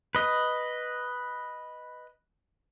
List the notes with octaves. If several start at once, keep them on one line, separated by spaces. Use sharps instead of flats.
B4 D#5